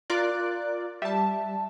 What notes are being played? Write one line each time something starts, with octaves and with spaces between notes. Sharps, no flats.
F4 A#4 D5 F#6
G3 E5 A5